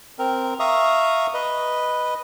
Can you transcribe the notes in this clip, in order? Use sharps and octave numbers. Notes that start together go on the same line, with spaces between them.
C4 A#4
E5 F5 A#5 C#6 D#6
B4 D#5